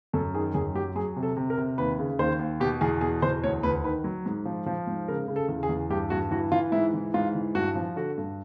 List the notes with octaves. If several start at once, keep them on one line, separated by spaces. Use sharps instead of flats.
F#2 A4
D#3 G#4
F#2 G#4
F#3 G4
F#3 G#4
C3
A4
C3
A#4
C3
D#2 B4
C#3
D#2 C5
D#2
B2 G4
E2 G#4
B2 G#4
E2 C5
D2 C#5
D2 B4
D#3 B4
F#3
G#2
F3
F3
G#2
C#3 A#4
C#3
A4
E2
G#4
E2
G2 G4
G2 F#4
E3 F#4
E3 F4
G#2 E4
E3
G#2 F4
E3
G2 F#4
F3
D3 F#4
G2